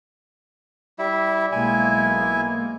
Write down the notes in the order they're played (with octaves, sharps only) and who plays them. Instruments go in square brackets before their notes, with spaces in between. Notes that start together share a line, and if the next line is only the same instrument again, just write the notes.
[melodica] G3 E4 E5
[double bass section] B1 G#3 A#3 [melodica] E4 G#5